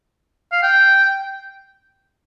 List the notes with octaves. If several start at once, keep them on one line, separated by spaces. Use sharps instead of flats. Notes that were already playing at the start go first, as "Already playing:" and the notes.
F5
G5